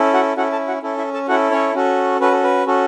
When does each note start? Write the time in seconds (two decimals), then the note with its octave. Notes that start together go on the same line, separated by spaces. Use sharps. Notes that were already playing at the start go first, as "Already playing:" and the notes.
Already playing: C#4 E4 A4
0.14 F#4 F#5
0.37 C#4 E4 F#4 A4 F#5
0.52 A4 A5
0.68 F#4 F#5
0.83 C#4 E4 A4
0.97 E4 E5
1.14 A4 A5
1.28 C#4 E4 F#4 A4 F#5
1.51 C#4 C#5
1.74 C#4 F#4 A4
2.20 C#4 F#4 A4 B4
2.32 A4
2.44 B4
2.67 C#4 F#4 A4